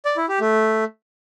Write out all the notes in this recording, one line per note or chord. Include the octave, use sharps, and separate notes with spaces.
D5
E4
G4
A3